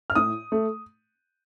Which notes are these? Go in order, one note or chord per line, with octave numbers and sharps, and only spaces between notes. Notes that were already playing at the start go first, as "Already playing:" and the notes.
F6
A2 D#6
A3